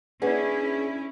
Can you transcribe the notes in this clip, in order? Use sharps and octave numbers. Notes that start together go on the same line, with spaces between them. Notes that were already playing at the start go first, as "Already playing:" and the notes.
A#3 C#4 D4 E4 G#4 B4 F#5